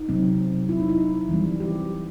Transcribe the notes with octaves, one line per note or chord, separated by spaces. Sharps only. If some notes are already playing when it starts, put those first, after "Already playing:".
Already playing: D#4
C3 F#3 C4
E4
D#4
E4
E3 G3 C4
G4